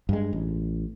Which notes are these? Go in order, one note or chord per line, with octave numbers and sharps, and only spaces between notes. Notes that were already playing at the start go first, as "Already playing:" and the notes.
G2 G#3
A1